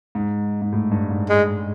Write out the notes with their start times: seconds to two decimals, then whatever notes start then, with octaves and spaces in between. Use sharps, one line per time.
0.15 G#2
0.62 G#2
0.72 A2
0.91 G2
1.10 G#2
1.29 G#3